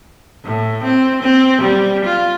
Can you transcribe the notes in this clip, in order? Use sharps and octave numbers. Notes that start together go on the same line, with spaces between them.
A2
C4
C4
G3
F4